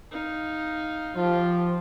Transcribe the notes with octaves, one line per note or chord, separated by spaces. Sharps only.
D#4 F5
F3 F4 G4